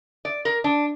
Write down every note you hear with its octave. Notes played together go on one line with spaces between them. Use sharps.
D5
A#4
D4